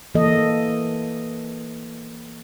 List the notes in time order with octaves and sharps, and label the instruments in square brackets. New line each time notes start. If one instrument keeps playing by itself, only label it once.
[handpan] E3 A#3 A4 D#5